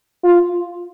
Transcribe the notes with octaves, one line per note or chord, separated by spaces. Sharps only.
F4